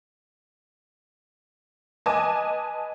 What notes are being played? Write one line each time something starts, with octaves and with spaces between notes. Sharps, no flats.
B4 D#5 G#5 A5 D6